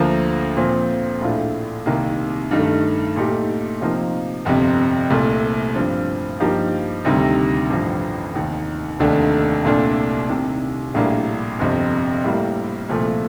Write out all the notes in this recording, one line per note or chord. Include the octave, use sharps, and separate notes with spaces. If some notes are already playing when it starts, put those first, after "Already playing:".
Already playing: D2 D3 F3 A#3
A#2 F3 C4
A#1 A2 A3 D4 F4
C2 C3 D#3 A#3
G2 D#3 A3
A#2 A3 D#4 G4
C3 F3 A#3 D#4
G1 F2 C3
C2 A#2 A3
G2 F3 C4
G2 F3 A#3 D#4 G4
D2 C3 D#3 G3
A1 G2 F3
F1 D#2 D#3
F1 D#2 D3 A3 D4
C2 A#2 A3 D4
C2 C3 D#3
A#1 A2 G3 A#3 D4
G1 F2 C3
A2 G3 A#3
C2 A#2 F3 A3